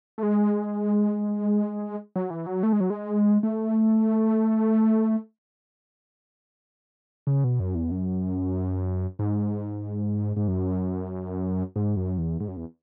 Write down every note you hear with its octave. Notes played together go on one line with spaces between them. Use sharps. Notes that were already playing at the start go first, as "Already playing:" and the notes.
A3
G#3
F#3
E3
F#3
A3
G#3
F#3
G#3
A3
C#3
B2
F#2
E2
F#2
G#2
G#2
F#2
G#2
F#2
E2
G#2
F#2
E2